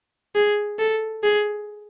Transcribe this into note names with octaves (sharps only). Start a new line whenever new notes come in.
G#4
A4
G#4